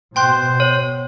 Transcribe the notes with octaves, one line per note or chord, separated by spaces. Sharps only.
B2 C5 G5 C6 F#6
C#5